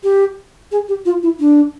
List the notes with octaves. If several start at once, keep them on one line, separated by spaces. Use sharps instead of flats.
G4
G#4
G4
F4
E4
D4